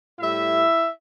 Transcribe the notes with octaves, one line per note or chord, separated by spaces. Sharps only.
A2 G3 E4 E5